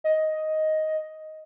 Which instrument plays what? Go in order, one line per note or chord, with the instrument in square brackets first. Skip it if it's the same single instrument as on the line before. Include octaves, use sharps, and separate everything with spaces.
[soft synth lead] D#5